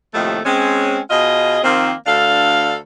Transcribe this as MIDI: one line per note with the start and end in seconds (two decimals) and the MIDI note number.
0.14 0.40 39
0.14 0.40 45
0.14 0.40 48
0.14 0.40 51
0.14 0.40 53
0.14 0.40 57
0.46 0.99 56
0.46 0.99 60
0.46 0.99 61
1.10 1.59 47
1.10 1.59 65
1.10 1.59 68
1.10 1.59 75
1.64 1.93 51
1.64 1.93 53
1.64 1.93 58
1.64 1.93 60
2.07 2.76 38
2.07 2.76 62
2.07 2.76 69
2.07 2.76 77